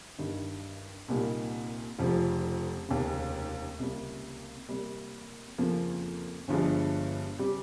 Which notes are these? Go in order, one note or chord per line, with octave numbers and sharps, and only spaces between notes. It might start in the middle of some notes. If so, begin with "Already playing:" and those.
G2 D#3 G3
C2 A#2 G3 A#3 D#4
F1 F2 C#3 F3
F1 D#2 C#3
C#2 C3 G3 A#3
C3 G3 A#3
F2 C#3 F3 A#3
G1 G2 F3 G#3
C#3 G3 C4 G4